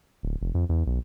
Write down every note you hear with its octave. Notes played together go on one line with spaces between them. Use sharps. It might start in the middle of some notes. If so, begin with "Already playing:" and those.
D1
F1
F2
E2
B1